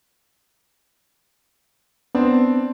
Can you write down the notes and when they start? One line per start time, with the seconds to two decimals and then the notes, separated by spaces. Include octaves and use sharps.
2.15 B3 C4 D4